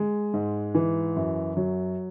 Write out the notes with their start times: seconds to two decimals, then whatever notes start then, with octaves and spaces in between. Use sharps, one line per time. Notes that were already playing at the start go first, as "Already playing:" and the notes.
Already playing: G#3
0.34 G#2
0.75 E3
1.16 F#2
1.57 F#3